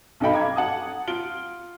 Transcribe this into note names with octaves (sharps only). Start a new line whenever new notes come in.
B1 G2 D#4 A4 G5 B5
F5 A#5 D6 G#6
F#5 A5 D#6
F4 D7 G7